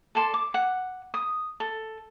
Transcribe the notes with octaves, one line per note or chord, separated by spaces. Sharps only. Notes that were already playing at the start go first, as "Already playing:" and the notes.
A4 D5 A5 C6
D6
F#5
D#6
A4